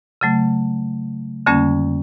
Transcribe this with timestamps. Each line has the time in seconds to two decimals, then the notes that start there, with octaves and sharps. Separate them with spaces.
0.21 C#3 F#3 A3
1.46 F2 D3 G3 A#3 C#4